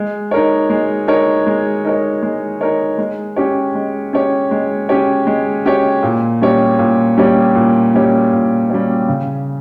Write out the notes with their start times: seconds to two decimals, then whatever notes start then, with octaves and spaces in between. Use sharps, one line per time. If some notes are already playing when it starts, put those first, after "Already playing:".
Already playing: G#3
0.31 D#4 A#4 C#5
0.70 G#3
1.08 D#4 A#4 C#5
1.47 G#3
1.85 D#4 A#4 C#5
2.23 G#3
2.61 D#4 A#4 C#5
2.98 G#3
3.36 C#4 G4 C#5
3.75 G#3
4.13 C#4 G4 C#5
4.51 G#3
4.89 C#4 G4 C#5
5.27 G#3
5.65 C#4 G4 C#5
6.03 A#2
6.41 G3 C#4 G4 C#5
6.79 A#2
7.18 G3 C#4 G4 C#5
7.55 A#2
7.94 G3 C#4 G4 C#5
8.32 A#2
8.70 G3 C#4 G4 C#5
9.08 C#3